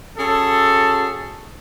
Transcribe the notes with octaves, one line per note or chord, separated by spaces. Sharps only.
C#4 F#4 G#4 A4